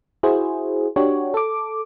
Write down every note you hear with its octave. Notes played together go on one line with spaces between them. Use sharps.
E4 F#4 G#4 C5
D4 F#4 G4 C#5
A4 D6